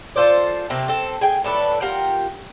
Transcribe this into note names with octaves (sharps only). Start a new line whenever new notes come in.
F4 A4 C5 D5
C3 A3 A#3 G4
C4 A4
G#4 G5 G#5
A2 D4 A4 B4
F4 G4 A#4 F#5